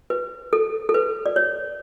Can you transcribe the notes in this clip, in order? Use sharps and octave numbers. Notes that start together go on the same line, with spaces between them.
B4
A4
A4
B4
D5
C#5